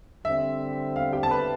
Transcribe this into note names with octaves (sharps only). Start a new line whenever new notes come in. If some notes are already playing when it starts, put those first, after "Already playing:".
D3 G3 C4 E5
F5
G4 G5
A5
B4 B5